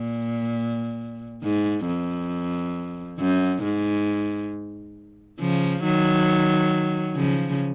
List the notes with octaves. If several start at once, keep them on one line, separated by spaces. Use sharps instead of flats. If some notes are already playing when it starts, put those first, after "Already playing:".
Already playing: A#2
G#2
F2
F#2
G#2
C#3 F3
D#3 F#3
C#3 F3